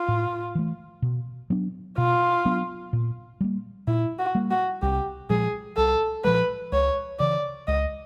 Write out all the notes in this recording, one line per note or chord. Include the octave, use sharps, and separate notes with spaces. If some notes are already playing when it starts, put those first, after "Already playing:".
Already playing: F4
A2
E3 A3
B2
F#3 B3 D4
B2 F4
F#3 B3 D4
A#2
G3 A#3
A#2 E4
F#4
G3 A#3
F#4
C2 G4
A#2 F3 G#3 G#4
C2 A4
A#2 F3 G#3 B4
C#2 C#5
C#3 E3 D5
C#2 D#5